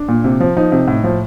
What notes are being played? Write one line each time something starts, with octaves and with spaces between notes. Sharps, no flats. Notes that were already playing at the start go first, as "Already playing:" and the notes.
Already playing: D4
A#2
C3
F3
F3 D#4
C3
A2
F3